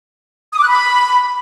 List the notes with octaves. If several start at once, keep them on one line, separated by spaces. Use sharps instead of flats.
D#6
D6
F#6
B5